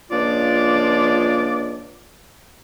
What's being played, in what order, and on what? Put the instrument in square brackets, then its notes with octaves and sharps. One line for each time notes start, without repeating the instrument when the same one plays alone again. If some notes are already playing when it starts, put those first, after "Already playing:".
[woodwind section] C#2 F3 A#3 D4 F4 D5